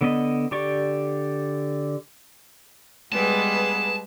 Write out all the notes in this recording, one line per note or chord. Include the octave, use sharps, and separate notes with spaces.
D3 B3 D#5
D3 G4 D5 C#6
G3 G#3 B3 G#4 B4 A5